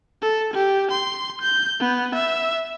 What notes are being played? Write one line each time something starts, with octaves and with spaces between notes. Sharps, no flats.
A4
G4
C6
G6
B3
E5